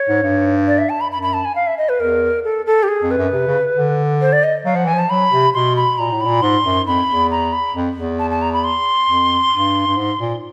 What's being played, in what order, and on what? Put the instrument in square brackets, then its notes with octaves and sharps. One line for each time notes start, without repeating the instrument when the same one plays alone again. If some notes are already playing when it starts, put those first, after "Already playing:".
Already playing: [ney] C#5
[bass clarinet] G#2
G2
[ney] D5
E5
A5
B5
[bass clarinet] F#2 [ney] B5
[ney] B5
A5
G#5
F5
E5
D#5
B4
[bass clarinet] E2 [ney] A#4
[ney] A4
A4
G4
G#4
[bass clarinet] F2
[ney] B4
[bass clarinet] F#2
C3
C#3
D3
[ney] C5
D5
D#5
[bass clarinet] F#3 [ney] F5
[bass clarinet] F3 [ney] F#5
[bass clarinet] E3 [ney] G#5
[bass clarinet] F3 [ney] A5
[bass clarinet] F#3 [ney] B5
[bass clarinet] C3
[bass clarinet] B2 [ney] C6
[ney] B5
[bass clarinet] A#2 [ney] A#5
[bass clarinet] A2
[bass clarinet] A#2 [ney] B5
[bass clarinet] G#2 [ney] C6
[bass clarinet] F#2
[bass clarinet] F2 [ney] B5
[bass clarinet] E2
[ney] A#5
B5
[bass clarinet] F2
E2
[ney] A5
A5
A#5
B5
C6
[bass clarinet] F2
G2
G2
G#2
A#2